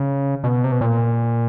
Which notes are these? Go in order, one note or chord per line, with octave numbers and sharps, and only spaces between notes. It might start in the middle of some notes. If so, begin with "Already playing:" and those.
Already playing: C#3
B2
C3
B2
A#2